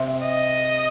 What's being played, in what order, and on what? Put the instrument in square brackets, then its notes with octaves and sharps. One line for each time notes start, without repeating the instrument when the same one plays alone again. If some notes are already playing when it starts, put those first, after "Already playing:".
Already playing: [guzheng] C3
[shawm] D#5